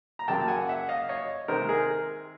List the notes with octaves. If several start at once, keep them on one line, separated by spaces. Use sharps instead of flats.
A#5
F#2 C#3 F#3 A#3 G5 A5
F#5 G#5
E5 F#5
D#5 F5
C#5 D#5
C3 D#3 G#3 A#4 C5
G#4 A#4